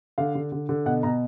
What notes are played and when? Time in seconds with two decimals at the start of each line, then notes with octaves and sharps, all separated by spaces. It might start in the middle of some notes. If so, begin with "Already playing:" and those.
0.18 D3 F5
0.35 D3
0.52 D3
0.69 D3
0.86 B2 F#5
1.03 B2 A#5